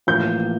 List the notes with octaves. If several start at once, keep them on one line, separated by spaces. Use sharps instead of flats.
A1 A2 F3 A#3 G6